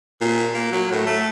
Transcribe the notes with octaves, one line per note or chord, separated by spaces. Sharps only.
A#2
A#3
F#3
A2
A3